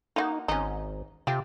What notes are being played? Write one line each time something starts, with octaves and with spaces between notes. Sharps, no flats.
A#3 D#4 E4 F#4
G#1 C#4 D#4
C3 F4 G4